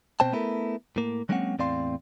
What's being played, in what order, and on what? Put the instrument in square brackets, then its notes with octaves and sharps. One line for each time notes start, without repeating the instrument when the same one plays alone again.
[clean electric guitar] B2 C4 C5 G5 A5
A3 B3 E4 A4 A#4
A2 A#3
F#3 G#3 A#3 C4 C#4 F#5
E2 A2 C4 D5 F5 C6